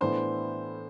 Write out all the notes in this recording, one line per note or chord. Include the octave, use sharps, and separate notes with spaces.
A2 E3 B3 D4 C5